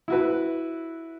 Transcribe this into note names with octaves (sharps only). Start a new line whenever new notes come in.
E4 F#4 B4